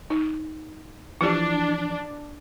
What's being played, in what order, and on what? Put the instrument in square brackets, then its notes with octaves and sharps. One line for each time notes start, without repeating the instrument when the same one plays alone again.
[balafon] D#4
[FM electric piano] E3 F3 [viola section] D4 [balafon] E4 G4